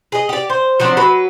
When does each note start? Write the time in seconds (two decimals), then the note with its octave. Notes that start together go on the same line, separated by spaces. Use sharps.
0.12 G#4 D#5
0.29 G4 D5
0.50 C5
0.80 F3 F#3 C4 D4
0.97 F#3 B4